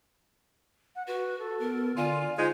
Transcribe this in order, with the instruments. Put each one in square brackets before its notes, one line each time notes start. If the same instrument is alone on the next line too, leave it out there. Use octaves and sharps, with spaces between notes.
[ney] F#5
[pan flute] F#4 [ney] B4
[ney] A4
[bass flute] B3 [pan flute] A#4
[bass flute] D3 [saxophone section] F4 [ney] D5 [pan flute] G#5
[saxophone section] G#3 D#4 [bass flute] F4 [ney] C5